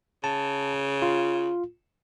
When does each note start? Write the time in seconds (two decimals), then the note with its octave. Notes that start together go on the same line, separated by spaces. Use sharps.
0.24 C#3 A5
1.02 F4